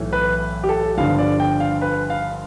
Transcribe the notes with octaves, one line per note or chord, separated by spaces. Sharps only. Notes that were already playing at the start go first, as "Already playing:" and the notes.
Already playing: B1 A2 E3 A3
B4
G4
A4
G1 G2 D3 F3 F5
D5
G5
F5
B4
F5